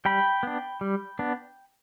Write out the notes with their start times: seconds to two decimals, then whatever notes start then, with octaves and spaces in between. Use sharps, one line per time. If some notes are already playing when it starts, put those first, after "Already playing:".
0.05 G3 G5 B5
0.43 B3 D4
0.81 G3
1.19 B3 D4